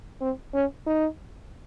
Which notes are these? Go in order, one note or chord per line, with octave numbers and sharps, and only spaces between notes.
C4
C#4
D#4